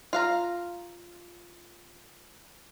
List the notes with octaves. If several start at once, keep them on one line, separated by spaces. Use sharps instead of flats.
F4 F5 A#5